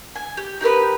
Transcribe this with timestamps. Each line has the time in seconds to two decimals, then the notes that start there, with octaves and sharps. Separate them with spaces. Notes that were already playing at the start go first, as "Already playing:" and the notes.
0.16 G#5
0.37 G4
0.61 D#4 G4 A#4 B4